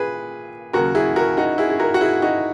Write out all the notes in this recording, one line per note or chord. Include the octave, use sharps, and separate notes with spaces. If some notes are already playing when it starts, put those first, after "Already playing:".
Already playing: A#2 G#4 B4
D#2 C#3 F#3 F#4 A#4
E4 G#4
F#4 A#4
D#4 F#4
E4 G#4
G#4
F#4 A#4
F#4
E4 G#4
D#4 F#4